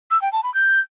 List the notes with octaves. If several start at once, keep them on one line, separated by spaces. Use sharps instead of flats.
E6
G5
A5
B5
G6